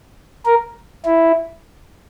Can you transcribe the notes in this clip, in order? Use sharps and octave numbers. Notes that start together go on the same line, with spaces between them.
A#4
E4